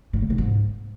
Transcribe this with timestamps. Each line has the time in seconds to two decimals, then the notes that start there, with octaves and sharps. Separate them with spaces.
0.13 A#2
0.22 C#3
0.30 C3
0.38 G#2